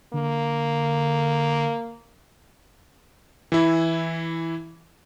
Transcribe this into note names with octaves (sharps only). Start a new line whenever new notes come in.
D3 A#3
E3 E4